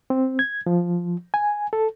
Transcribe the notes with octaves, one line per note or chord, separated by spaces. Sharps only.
C4
G#6
F3
G#5
A4